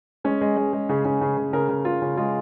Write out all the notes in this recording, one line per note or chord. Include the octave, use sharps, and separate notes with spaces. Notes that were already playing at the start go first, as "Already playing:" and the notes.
G#3 C#4
G#3
G#3
G#3
C#3 G#4
C#3
C#3
C#3
C#3 A#4
C#3
C#3 F4
C#3
G#3 F4